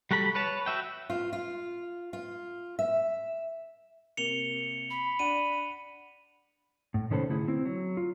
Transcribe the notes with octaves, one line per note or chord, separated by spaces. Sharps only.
G3 F#4 A4 B5
B4 C#5 A5
F#4 E5 G5
F4
F4
F4
E5
C3 A#3 C#7 F7 G7
B5
D4 D5 F#5 D#7
A2
C3 D#3 C#4 A4 B4 C5
D3 A3 E4 G#4
C4 E4
F#3
F4